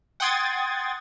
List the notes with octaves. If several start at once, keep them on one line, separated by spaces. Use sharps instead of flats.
F#5 G5 C6 D#6 G#6 A6